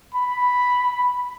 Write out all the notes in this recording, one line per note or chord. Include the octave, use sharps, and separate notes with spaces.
B5